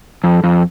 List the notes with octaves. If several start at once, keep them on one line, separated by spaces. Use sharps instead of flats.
F2
F2